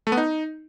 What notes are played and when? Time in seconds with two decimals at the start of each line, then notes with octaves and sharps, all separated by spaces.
0.07 A3
0.12 B3
0.17 D#4